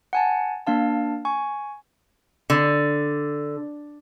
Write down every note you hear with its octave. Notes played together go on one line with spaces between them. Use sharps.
F#5 G#5 A5
A#3 D4 F5 A5
G#5 C#6
D3